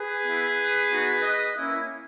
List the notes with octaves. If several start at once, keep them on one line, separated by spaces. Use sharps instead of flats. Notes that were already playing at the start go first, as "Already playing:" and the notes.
Already playing: G#4 B4
B3 E4
B3 D#4 F#4
B4 D#5
A#3 C#4 E4